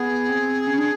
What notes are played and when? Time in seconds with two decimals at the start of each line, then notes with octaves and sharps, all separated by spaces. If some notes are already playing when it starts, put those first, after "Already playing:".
Already playing: B3 G#4
0.29 C4
0.67 C#4
0.78 D4